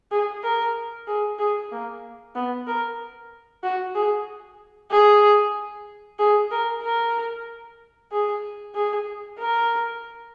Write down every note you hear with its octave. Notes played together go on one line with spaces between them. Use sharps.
G#4
A#4
G#4
G#4
A#3
B3
A#4
F#4
G#4
G#4
G#4
A#4
A#4
G#4
G#4
A#4